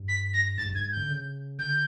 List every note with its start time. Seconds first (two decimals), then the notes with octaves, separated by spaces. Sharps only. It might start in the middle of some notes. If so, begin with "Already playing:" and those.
Already playing: G2
0.08 B6
0.34 A#6
0.58 G#2 A6
0.66 G2
0.73 G#2 G#6
0.92 G6
0.97 D3
1.09 C#3
1.59 D3 G6